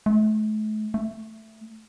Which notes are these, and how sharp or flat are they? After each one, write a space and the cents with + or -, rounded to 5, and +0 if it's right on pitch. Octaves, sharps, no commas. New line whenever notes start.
A3 -40
A3 +5